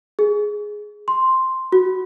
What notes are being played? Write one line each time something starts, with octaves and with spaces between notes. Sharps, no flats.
G#4
C6
F#4